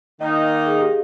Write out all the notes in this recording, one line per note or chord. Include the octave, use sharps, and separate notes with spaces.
D#3 A#3 D#4 D#5
F5
D#5
G#4
G4